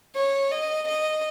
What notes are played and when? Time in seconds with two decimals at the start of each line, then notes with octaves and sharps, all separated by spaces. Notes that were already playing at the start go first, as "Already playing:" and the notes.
0.15 C#5
0.52 D#5
0.88 D#5